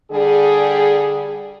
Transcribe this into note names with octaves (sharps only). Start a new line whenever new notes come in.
D3 G3 G#4